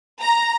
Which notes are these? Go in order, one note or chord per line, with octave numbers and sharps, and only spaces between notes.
A#5